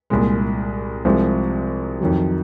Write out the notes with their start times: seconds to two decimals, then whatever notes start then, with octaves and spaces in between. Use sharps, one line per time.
0.10 C2 A#2 G#3
1.05 C2 C3 F3 G#3
2.01 F2 D#3 F#3